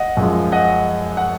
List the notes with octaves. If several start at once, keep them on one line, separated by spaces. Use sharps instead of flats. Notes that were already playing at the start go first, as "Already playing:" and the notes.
Already playing: D#5 F#5
F#2 F3 G#3
D#5 F#5
F#5